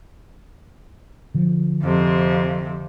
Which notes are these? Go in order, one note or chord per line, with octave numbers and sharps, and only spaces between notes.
D3 F3
F2 C3